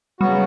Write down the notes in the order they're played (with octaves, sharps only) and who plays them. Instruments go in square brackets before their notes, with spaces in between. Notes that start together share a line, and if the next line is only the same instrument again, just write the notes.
[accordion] C#3 F#3 B3 F#4 [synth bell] G3